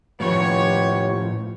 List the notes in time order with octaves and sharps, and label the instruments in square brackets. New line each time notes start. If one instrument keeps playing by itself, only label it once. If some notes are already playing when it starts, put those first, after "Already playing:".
[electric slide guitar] A2 F3 [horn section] B3 G4 C#5